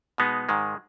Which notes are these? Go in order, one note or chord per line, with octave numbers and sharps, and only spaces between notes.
B2 G#3 B3 D#4
G#2 D#3 G#3